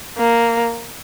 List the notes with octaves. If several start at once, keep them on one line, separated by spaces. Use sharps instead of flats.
A#3